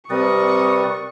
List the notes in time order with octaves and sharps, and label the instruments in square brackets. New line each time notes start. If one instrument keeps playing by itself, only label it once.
[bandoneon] C3 G3 [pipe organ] C4 B4 D5 [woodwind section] A#4 D#6 [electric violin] C#6